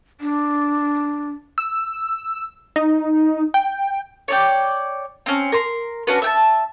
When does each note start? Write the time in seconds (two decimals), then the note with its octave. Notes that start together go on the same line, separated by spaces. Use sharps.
0.21 D4
1.58 E6
2.76 D#4
3.54 G5
4.28 C#5 D5 G5
5.26 C4 C#4
5.52 A#4 C6
6.07 C#4 D4 F#4 B4
6.22 E5 G5 A5